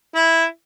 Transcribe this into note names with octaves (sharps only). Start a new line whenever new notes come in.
E4